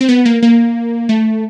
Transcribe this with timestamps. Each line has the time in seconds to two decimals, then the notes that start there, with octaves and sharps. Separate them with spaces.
0.01 C4
0.09 B3
0.26 A#3
0.42 A#3
1.09 A3